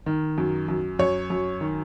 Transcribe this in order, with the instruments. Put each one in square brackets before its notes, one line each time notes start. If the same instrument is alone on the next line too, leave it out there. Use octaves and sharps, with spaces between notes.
[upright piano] D#3
F#2
F#2
F#2 C#5
F#2
D#3